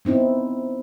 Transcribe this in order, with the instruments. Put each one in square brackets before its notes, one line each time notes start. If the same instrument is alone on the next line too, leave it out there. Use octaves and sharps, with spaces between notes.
[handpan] B3 C4 D#4 E4